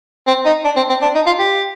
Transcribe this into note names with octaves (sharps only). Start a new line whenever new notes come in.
C4
D#4
D4
C4
C4
D4
D#4
F4
G4